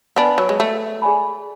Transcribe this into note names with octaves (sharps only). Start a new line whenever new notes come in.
B3 D4 B4 D5 G#5 B5
F#3
G#3
A3
G#4 D5 G#5 B5